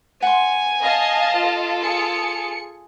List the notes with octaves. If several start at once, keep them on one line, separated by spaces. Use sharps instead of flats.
F#5 G#5 C6
D#5 F5 A5
F4 A4
G#4 C#7